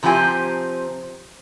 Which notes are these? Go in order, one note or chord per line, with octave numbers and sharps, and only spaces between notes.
C3 F3 C4 G4 G#5